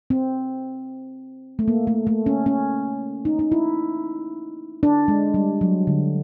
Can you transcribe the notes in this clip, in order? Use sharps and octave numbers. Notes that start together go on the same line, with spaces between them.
C4
A3
A#3
A3
A3
C#4
C#4
D#4
D#4
E4
D4
G#3
G3
F#3
D3